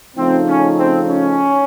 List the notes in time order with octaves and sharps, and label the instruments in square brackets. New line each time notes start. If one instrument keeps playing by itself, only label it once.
[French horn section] C#3 F3 A3 D#4 [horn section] C4
[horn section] C#4
C4
C#4